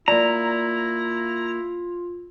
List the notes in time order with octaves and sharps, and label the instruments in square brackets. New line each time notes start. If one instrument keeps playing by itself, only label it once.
[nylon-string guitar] A#3 D5 [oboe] E4 [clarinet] F4 [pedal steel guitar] A#5